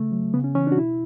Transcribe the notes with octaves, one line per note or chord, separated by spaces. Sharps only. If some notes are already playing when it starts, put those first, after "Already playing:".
Already playing: C#3 A3
F#3
C#3 B3
C#4
E3 C#4
D4
F#4
B2 E4